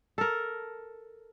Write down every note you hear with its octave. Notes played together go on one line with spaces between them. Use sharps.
A4 A#4